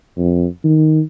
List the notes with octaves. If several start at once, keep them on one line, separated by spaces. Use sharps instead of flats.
F2
D#3